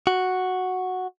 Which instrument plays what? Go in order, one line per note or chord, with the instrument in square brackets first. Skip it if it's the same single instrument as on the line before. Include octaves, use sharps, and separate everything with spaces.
[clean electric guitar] F#4